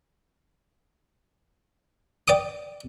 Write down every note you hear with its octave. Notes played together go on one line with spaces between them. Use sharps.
D5 G5 D6 D#6